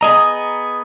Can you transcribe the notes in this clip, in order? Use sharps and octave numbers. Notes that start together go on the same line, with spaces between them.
B3 G#4 D#5 A#5